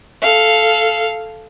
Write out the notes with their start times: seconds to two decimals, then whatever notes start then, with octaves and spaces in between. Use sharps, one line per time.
0.22 A4 F5